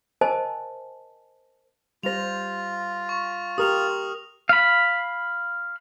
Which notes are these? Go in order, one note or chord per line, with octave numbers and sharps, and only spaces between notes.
A#4 C5 D#5 G#5 A5
G3 F4 C5 A#6 F7
C#6
G4 A#4 D#6 F6 F7
F5 B5